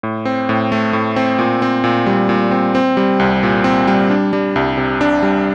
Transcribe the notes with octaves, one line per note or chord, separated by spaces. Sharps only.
A2
C4
A2
A3
A2
C4
A#2
C4
A#2
G3
A#2
C4
C4
G3
C2
A#2
C4
G3
D4
G3
C2
C3
D4
G3